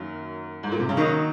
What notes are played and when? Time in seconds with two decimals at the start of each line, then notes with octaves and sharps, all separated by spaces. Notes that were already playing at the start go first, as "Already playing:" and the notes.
Already playing: F#2 D#3 F#3 A#3
0.63 G#2
0.72 A#2
0.80 C3
0.89 C#3
0.97 D#3 F#3 A#3 D#4